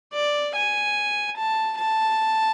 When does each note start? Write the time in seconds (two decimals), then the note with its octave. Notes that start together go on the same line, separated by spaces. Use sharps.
0.13 D5
0.55 G#5
1.37 A5
1.78 A5